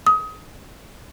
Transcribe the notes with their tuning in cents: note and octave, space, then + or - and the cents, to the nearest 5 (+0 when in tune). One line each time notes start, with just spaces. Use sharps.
D#6 +25